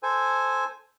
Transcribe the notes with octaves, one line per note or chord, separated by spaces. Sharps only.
A4 C5 G#5